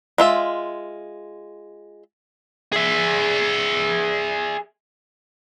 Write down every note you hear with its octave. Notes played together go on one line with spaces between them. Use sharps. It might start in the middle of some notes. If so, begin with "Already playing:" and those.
G#3 F4 E5
G#4 E5